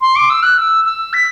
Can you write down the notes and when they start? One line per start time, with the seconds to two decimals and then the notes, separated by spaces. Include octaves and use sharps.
0.01 C6
0.16 D6
0.30 E6
0.43 F#6
0.58 E6
0.85 E6
1.13 B6